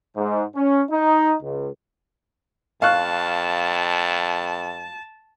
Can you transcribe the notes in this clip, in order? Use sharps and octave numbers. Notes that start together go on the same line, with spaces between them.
G#2
C#4
D#4
C#2
F2 F5 A5 C#6 F#6